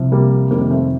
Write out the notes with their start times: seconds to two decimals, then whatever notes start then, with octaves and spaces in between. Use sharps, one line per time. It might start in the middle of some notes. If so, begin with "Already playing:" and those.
Already playing: C2 C3 F3
0.12 G3 A#3
0.51 F2 C3 D#3 G3 A#3
0.61 A#3
0.70 A3 C4